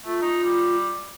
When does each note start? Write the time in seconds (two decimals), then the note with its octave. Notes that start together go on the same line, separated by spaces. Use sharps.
0.06 A3 F4
0.22 D#4
0.44 G3